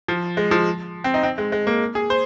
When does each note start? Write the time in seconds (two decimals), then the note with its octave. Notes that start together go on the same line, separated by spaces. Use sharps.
0.08 F3
0.37 G#3
0.51 F3
1.04 C4
1.14 D#4
1.23 C4
1.38 G#3
1.52 G#3
1.67 A#3
1.95 G#4
2.10 C5